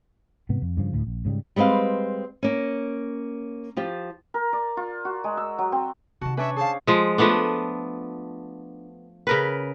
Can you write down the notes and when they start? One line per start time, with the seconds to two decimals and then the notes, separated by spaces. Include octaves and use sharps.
0.49 G#2 C3 B3
0.62 F2
0.77 G2 C#3 F3
0.93 D2 A2
1.07 A#1
1.25 G#2 C#3 F3 G3
1.56 G3 G#3 C4 B4 F5
2.43 A#3 C#4
3.77 F3 F4 G4
4.34 A#4
4.53 D5
4.77 F4
5.05 F#4
5.24 G#3
5.37 E6
5.59 F#3
5.72 C4
6.21 C3 D#3 F#4 A5
6.37 C#4 D4 B4 C#5 E5
6.56 G#4 C5 F5 A5
6.87 F3 G#3
7.18 F3 A3 B3 D4
9.27 C#3 A#4 B4